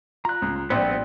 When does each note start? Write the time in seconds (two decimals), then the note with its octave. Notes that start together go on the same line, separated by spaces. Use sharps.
0.25 F4 A#5 F#6
0.42 C#2
0.70 A#1 G3 B3 C4 C5 F#6